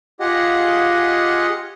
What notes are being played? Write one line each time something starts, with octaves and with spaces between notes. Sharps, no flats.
F4 G4 G#4 D#5 F#5